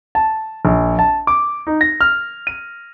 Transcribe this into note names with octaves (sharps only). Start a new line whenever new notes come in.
A5
A#1
A5
D6
D#4
A#6
F6
D#7